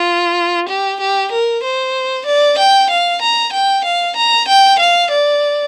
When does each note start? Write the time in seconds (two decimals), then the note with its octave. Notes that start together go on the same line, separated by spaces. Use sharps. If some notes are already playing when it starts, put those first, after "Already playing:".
Already playing: F4
0.69 G4
1.01 G4
1.32 A#4
1.64 C5
2.26 D5
2.58 G5
2.90 F5
3.22 A#5
3.53 G5
3.85 F5
4.16 A#5
4.48 G5
4.80 F5
5.11 D5